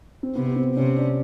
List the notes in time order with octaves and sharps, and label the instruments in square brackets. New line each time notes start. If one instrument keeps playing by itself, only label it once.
[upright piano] C4
[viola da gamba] C3 [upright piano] B3
[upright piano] B3
C4
[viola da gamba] C3 [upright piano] C#4
[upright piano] D4